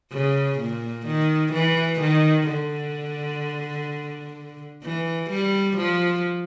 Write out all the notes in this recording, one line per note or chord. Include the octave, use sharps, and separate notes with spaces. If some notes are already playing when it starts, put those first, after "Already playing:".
C#3
A#2
D#3
E3
D#3
D3
E3
G3
F3